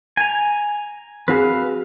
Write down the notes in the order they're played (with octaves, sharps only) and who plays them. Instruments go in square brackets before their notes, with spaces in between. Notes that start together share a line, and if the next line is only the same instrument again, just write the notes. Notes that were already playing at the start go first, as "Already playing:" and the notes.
[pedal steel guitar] G#5 A#5
[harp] C4 F#4 G#4 [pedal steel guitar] B4 F5